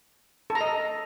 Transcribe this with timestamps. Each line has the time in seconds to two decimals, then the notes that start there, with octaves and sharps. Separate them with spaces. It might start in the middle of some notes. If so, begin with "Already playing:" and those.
0.50 A4
0.55 A#5
0.61 D#5